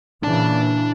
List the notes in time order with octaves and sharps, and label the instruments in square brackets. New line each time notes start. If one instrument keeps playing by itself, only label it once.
[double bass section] A#2 C#3 E3 [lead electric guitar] D4 A5